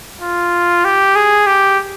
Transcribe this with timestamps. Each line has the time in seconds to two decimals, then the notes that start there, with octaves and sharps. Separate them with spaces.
0.21 F4
0.85 G4
1.16 G#4
1.47 G4